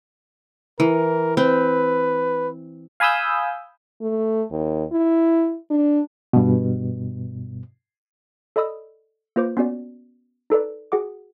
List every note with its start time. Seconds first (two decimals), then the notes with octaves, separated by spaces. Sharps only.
0.80 E3 A#4
1.37 C4 B4
3.00 F5 G#5 B5 D#6 E6 G6
4.02 A3
4.51 D#2
4.92 E4
5.71 D4
6.33 G2 B2
8.56 A4 D5 D#5 B5 D#6 E6
9.36 A#3 F4 B4 C5 D6
9.57 B3 C#4 F#4 D5
10.50 D#4 A4 B4 D5
10.92 F#4 G#4 F#5 D6